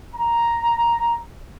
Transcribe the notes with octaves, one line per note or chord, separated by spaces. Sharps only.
A#5